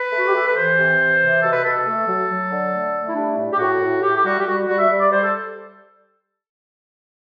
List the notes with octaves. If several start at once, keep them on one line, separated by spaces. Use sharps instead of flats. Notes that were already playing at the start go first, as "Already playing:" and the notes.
Already playing: B4
A3
F#4
G4
A3 A4
B4
E3 C5
C3
E3
C3
B2 A4
B4
B2 A4
A3
F#3
F#3
D3
A3
A3
E4
G3 D4
A2
G4
A2 F#4
A2
A2 G4
G4
G3 F#4
G4
G3 F#4
G3 F#4
E5
G3
D5
G3 C5
A4